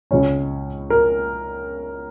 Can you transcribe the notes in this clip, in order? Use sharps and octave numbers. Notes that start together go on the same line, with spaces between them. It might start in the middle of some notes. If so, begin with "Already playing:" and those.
C#2 C#3 G#3 C#4 C#5
A#4